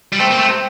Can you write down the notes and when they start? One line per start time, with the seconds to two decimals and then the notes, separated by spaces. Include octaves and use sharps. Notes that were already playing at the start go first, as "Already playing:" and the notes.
0.13 G3
0.20 A3 C4
0.31 A#3
0.39 A3
0.49 C3